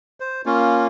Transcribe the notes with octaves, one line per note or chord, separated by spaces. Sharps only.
C5
A#3 C#4 F4